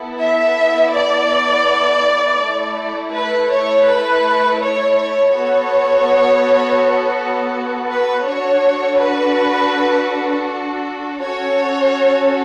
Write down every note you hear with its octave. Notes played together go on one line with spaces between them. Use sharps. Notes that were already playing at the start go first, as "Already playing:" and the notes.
Already playing: B3 E4 A4
E5
D5
A3 E4 A4
B4
C#5
B4
C#5
C#5
B3 F#4 A4 C#5
B4
D4 F#4 A4 C#5
B4
C#4 F#4 A4 C#5